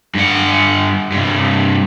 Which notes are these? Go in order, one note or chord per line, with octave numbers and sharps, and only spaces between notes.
G2 F#5
G2 C3